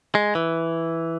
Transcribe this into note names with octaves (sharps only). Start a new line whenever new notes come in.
G#3
E3